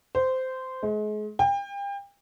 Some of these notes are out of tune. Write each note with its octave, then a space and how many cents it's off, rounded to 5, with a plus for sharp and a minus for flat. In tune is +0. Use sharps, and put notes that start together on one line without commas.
C5 -15
G#3 +35
G5 +35